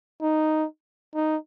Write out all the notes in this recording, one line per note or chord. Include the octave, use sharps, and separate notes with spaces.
D#4
D#4